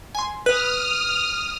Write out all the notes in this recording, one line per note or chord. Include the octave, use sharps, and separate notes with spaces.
G#5 C6
B4 D#6 F6 F#6